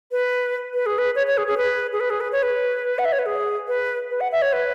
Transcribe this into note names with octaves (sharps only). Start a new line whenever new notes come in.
B4
B4
G#4
B4
C#5
C#5
G#4
G#4
B4
G#4
B4
G#4
B4
C#5
B4
F#5
E5
C#5
B4
G#4
B4
B4
F#5
E5
C#5
B4